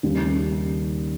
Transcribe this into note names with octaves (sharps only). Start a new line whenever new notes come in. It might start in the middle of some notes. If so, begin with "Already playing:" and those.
D#2 C#3 G3